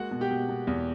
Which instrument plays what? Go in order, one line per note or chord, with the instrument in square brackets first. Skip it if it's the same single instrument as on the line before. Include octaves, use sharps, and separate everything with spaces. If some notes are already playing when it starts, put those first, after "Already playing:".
Already playing: [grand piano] G#3 A#3 F#4 F#5
B2
G4 G5
B2
B2
E2